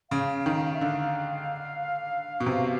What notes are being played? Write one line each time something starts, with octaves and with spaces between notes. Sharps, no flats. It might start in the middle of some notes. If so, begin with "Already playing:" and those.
C#3 F5
D#3
E5
D3 F5
B2
C3